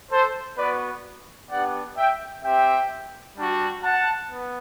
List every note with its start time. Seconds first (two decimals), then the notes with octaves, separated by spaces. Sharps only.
0.11 A4 C5
0.58 B3 F#4 B4 D5
1.51 B3 D4 G4 D5 F#5
1.97 E5 G5
2.44 C4 G4 E5 G5
3.37 G3 D4 F#4
3.83 F#5 A5
4.30 B3